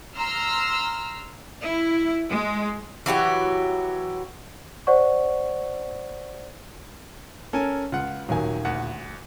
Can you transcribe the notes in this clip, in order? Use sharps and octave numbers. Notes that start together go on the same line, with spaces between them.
A#5 C6 E6 F6
E4
G#3
E3 F#3 F#4 G4
C5 D5 F#5 C#6
C#4 A4 A#4 G#5
C#2 F4 F#5
D#1 D#3 F#3 G#5
D2 F#5